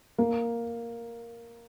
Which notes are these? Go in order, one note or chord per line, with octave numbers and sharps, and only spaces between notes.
A#3